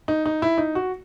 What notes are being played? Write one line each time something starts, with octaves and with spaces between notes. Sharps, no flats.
D#4
D#4
E4
D#4
F#4